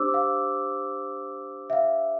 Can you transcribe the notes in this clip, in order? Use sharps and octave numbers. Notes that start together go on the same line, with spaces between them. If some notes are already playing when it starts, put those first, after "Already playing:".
Already playing: D4 G4 C5 D6 E6
F5
E5
F5